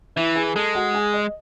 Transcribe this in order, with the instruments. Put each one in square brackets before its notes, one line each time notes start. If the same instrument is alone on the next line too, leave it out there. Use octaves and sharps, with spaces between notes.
[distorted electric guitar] E3 [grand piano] E4 E5
[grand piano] G#4 G#5
[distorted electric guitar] G#3 [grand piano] A4 A5
[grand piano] F#4 F#5
G#4 G#5
D#5